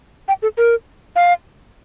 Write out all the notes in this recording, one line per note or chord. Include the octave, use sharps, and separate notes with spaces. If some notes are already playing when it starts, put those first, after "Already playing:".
G5
A4
A#4
F5